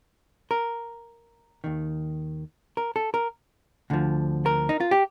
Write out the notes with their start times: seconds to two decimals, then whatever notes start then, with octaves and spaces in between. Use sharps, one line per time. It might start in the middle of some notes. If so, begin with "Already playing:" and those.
0.51 A#4
1.64 D#2 D#3
2.77 A#4
2.96 A4
3.14 A#4
3.90 D2 D3 F3
4.46 A#4
4.69 D#4
4.80 F4
4.91 G4